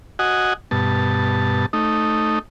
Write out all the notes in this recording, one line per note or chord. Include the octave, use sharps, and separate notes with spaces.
F#4 D#5 F#5 G#5
G2 B2 A5
A3 D#4